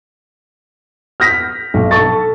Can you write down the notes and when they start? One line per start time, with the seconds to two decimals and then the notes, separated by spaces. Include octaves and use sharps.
1.20 F6 G6 A#6 B6
1.74 B1
1.91 A4 C#6 A6